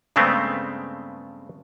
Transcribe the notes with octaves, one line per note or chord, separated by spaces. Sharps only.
G2 C#3 G#3 A3 B3 C4